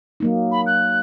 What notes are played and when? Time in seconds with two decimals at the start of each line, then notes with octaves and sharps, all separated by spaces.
0.20 F#3 A#3 D#4
0.51 B5
0.66 F#6